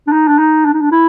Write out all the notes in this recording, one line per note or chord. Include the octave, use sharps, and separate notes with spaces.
D4
D#4
D4
D#4
D4
D#4
D4
E4